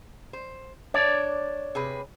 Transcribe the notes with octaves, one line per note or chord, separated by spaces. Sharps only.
C5
D4 C#5 D5
C3 G#4 B4